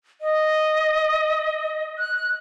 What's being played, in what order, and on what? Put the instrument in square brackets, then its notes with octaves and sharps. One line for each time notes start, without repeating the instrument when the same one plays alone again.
[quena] D#5
F#6